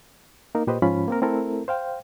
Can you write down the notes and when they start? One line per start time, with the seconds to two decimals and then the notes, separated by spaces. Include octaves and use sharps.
0.55 A#3 D#4 A#4
0.67 A#2 G4 B4 C5 D#5
0.82 G#2 F3 C#4 F4 B5
1.08 A#3 C4 A#4
1.22 A3 C4 E4 A4 A#4
1.68 C5 F5 G5